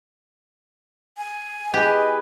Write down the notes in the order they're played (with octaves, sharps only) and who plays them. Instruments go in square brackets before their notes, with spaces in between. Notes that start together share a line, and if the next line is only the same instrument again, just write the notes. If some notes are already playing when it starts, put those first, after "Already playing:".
[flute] G#5
[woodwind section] E2 G#4 B4 [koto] G4 [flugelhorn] D#5